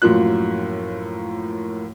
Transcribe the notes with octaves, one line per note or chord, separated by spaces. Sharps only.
F#2 A2 F3 A#3 F4 F#6